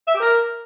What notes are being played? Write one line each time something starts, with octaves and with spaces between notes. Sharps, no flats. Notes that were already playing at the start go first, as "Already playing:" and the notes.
E5
G4
A#4